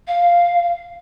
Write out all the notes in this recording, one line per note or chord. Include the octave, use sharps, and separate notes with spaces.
F5